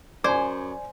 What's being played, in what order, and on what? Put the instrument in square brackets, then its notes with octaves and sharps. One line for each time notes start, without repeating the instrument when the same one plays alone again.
[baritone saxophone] F#2 [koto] C5 [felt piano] D5 G#5 [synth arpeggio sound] D6 G#6